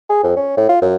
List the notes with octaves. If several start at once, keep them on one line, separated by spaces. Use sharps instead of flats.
G#4
F2
C#4
A2
F4
F#2